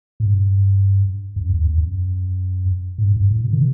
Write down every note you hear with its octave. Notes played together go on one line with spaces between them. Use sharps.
A2
G2
F#2
E2
E2
F#2
A2
G2
G2
A2
B2
D#3
C3